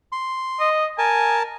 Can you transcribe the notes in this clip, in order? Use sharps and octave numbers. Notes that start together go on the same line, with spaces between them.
C6
D#5
A#4 G#5 A5